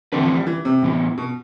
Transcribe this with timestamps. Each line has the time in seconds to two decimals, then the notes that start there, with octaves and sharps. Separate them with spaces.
0.12 D3 E3 A3 C4 G4 B4
0.23 F3
0.36 G3
0.47 E3
0.65 C3
0.83 A2 E3 B3
1.18 B2